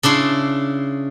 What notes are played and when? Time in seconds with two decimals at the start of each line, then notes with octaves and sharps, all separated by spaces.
0.03 C#3 D4 E4 C6